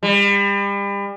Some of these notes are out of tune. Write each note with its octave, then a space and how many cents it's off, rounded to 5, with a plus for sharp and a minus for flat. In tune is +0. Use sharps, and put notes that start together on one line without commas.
G3 +35